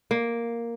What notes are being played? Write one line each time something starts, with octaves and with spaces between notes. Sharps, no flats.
A#3